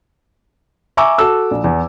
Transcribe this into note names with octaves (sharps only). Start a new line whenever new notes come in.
E5 G#5 A#5 C#6 D6 E6
F#4 A4 A5 E6
A#1
E2